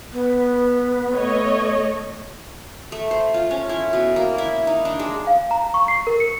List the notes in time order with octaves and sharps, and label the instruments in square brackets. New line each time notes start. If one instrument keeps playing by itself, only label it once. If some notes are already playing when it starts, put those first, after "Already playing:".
[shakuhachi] B3
[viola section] A3 C#5 D#5
[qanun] A3
C5
F4
C#4
E4
B2
A#3
E4
D#4
D4
G#3
[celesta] F5
A#5
C#6
C7
A#4
C#7